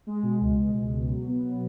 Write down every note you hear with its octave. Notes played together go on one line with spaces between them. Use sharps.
G#3
B2
C#2
G#3
G#3
B2
F#3
B3
B3